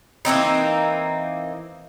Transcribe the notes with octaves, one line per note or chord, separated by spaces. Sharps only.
E3 A#3 C4 D#4